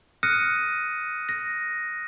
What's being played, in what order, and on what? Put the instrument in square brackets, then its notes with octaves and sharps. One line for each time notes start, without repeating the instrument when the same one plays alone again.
[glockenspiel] D#6 F6 F#6 A#6 C#7 D#7
A#6